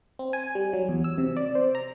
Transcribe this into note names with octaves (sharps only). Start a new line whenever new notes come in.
C4
G#5
G3
F#3
E2
E6
C3
D5
C5
A#5